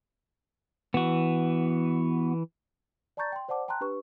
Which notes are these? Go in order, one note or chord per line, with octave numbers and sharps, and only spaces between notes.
E3 B3 F#4
D5 A5 A#5 C#6 G6 A6
G5 C6
C5 D5 F#5 A5 D6
G5 A5 A#5 C6 F#6
D4 G4 B4 C#6